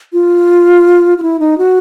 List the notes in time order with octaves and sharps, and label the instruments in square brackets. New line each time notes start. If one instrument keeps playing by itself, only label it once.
[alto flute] F4
F4
E4
D#4
F#4